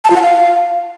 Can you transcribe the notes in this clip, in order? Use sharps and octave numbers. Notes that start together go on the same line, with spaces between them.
A5
F4
F#5
F5